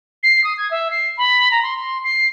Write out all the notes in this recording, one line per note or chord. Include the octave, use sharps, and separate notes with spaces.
C7
D#6
G#6
E5
C7
B5
A#5
C6
C6
C7